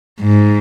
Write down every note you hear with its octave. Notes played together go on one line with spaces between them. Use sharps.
G#2